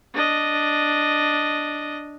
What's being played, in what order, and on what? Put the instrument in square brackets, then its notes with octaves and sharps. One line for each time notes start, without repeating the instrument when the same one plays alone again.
[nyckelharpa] D4 D#5